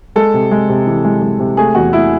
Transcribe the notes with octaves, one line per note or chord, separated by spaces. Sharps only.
G#3 A4
C3
G#3
C3
E3
G#3
G#3
C3
A3 G#4
E2 F#4
A3 E4